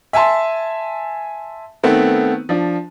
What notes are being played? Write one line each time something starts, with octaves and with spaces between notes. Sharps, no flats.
E5 G#5 A5 C6
D#3 A3 B3 C4
F3 D4